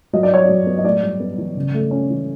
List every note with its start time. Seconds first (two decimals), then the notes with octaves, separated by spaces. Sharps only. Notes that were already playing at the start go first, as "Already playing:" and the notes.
0.13 F#3 D#5
0.23 D5
0.30 E4 C#5
0.44 D5
0.49 F#3
0.66 B3
0.78 D#5
0.84 A2 D5
1.02 G3
1.20 B3
1.38 E3
1.56 C#3
1.74 A3
1.91 C#4
2.10 E3